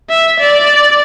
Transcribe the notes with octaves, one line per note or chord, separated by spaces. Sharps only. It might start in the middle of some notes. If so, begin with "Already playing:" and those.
E5
D5